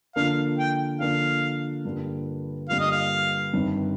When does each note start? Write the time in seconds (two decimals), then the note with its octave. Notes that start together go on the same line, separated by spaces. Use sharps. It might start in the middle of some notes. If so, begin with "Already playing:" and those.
0.16 D3 F3 A#3 D4 F5
0.58 G5
1.00 D3 F3 A#3 D4 F5
1.85 G2 D3 G3 A#3 F4
2.69 G2 D3 G3 A#3 F4 F5
2.80 D#5
2.92 F5
3.53 G1 G2 D#3 G3 C4